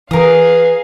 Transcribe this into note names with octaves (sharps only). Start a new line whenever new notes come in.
E3 G#4 A#4 B4 F5 G#5 D#6